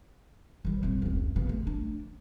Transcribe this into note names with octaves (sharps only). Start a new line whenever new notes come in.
D#3 G3
D#1 C4
F1 C#2
C#3 B3
A3
D4